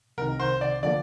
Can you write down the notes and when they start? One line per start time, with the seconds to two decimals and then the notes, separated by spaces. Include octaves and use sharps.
0.18 C2 C3 D#3 A#4
0.39 C5
0.61 D5
0.83 D3 F3 A#3 D5